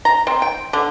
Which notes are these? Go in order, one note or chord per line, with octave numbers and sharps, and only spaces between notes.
A#5
C4
G5
D3